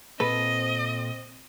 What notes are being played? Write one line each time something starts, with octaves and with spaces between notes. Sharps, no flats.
A#2 C4 A4 B4 D#5